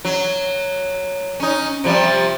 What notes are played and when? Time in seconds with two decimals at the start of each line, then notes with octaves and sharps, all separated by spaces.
0.05 F#3
1.40 C#4 D#4
1.84 C3 F3 G3